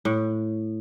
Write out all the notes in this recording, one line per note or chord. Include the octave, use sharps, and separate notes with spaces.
A2